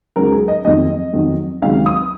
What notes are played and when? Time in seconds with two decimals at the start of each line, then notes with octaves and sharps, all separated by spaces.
0.16 C#2 C#3 F#3 A#4
0.32 G#4
0.48 D#5
0.65 F2 D#3 F#3 D#5
1.13 F2 D#3 F#3
1.62 C#2 C3 D#3 F#3 F5
1.86 D#6